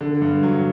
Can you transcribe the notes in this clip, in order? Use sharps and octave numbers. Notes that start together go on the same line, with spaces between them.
D3
G2
F#3